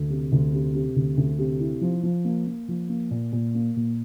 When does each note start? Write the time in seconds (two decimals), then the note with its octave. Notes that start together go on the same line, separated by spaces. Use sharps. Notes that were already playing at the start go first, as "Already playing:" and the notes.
Already playing: D2
0.10 C3
0.32 D2
0.54 C3
0.75 C3
0.96 D2
1.17 D2
1.39 C3
1.60 E4
1.81 F3
2.03 F3
2.25 A#3
2.47 A#3
2.68 F3
2.89 A#3
3.11 A#2
3.33 A#2
3.55 A#3
3.76 A#2